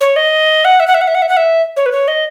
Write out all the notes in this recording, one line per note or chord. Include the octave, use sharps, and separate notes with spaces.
C#5
D#5
F#5
E5
F#5
E5
F#5
E5
F#5
E5
F#5
E5
C#5
B4
C#5
D#5